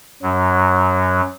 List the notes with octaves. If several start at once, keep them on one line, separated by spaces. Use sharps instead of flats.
F#2 F#3